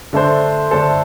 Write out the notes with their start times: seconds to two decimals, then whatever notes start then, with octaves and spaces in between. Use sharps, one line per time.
0.13 D3 A3 D4 A4 C5
0.71 D3 A3 D4 A4 C5